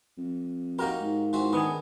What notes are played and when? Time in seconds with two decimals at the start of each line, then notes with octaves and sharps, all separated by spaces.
0.17 F2
0.79 A#3 D#4 F#4 G4 A#4
1.00 G#2
1.33 E3 C4 F#4
1.53 D#3 B3 D4 G#4